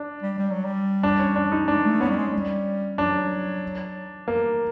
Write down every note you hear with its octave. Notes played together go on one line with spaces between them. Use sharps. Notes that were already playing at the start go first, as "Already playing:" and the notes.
Already playing: D4
G3
G3
F#3
G3
D4
C#4
D4
D#4
G#3 D4
A3
B3 C#4
G3
G#3
G3
F#3 D4
A#3